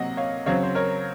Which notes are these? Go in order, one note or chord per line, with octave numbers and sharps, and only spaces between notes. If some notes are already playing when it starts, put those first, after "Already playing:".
Already playing: C3 F#3 A#3 D#5 F#5
C#5 F5
C#3 F#3 C4 C#5 F5
C5
A#4 C#5